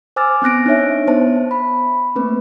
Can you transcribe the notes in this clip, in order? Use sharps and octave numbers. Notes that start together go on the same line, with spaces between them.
C5 G#5 D6 E6 F6 A6
B3 C4 F#6 A#6 D7
D4 D#4 C#5 E5
B3 C5 E5 A5
B5
A3 A#3 C4 B4